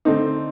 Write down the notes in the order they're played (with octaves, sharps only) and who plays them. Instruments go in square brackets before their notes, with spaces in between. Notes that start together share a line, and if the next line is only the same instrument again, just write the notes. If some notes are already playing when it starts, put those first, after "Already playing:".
[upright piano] D3 A3 C4 D#4